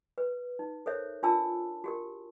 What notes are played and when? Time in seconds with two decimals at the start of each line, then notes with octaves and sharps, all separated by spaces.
0.18 B4
0.59 D#4
0.86 A4 A#4 C5 C#5 E5
1.23 D4 F4 A#4 G#5 A5 E6
1.84 F#4 G4 A#4